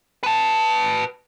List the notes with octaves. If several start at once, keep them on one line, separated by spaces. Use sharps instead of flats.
B4 A5